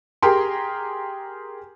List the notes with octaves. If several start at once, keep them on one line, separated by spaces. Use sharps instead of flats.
G4 G#4 A#4 G5 A#5 C6